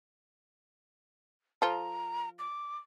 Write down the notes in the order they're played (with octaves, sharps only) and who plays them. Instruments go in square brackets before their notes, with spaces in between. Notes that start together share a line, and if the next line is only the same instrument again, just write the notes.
[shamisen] F3 F4 A4 [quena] A#5
[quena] D6